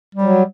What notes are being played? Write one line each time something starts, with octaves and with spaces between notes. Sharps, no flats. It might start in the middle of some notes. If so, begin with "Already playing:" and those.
G3
F#3